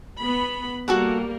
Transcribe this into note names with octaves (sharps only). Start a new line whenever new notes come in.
B3 B5
G3 A#3 F#4 A4 A#4 F#5